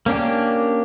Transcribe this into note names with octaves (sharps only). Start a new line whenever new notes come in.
A#3 C#4 D4 G4